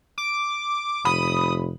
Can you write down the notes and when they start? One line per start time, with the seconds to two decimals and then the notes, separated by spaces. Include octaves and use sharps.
0.18 D6
1.05 F1 B5 D#6